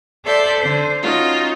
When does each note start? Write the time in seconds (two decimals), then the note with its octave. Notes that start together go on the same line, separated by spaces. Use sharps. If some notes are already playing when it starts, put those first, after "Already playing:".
0.24 A4 C5 D5 E5 G6
0.59 D3 C5
1.03 C#4 D#4 F4 F#4